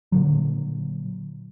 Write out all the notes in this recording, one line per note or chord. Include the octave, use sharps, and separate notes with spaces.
A#2 D3 F#3